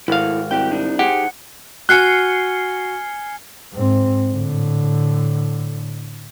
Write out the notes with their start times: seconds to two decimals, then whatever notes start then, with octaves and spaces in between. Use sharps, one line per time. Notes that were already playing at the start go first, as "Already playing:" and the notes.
0.08 G#1 E4 A4 F5
0.51 C2 F#4 G4 G5
0.72 D4 D#4
0.99 D#4 G4 G#4 C5 F#5
1.89 F#4 G#5 F6 F#6 G#6 C7 C#7 G7
3.73 G#2 C4
4.32 A2 D3